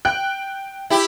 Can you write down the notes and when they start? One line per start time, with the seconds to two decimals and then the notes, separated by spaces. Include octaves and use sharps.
0.05 G5 F#6
0.90 E4 G4